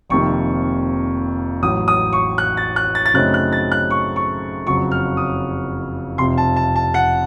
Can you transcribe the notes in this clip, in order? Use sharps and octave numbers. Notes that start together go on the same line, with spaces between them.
F1 F2 C3 D#3 A#3 C#6
A1 A2 F#3 D#6
D#6
C#6
F#6
A6
F#6
A6
A6
F#2 C#3 A3 C4 D#4 F#6
F#6
A6
F#6
C#6
C#6
F#1 F2 C#3 F#3 C#6
F6
D#6
F1 F2 C3 C6
A5
A5
A5
F#5